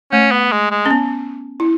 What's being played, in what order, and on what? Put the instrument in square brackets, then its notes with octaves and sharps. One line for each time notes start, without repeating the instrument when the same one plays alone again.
[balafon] A3 [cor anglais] C#4
[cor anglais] B3
G#3
G#3
[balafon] C#4
B3
E4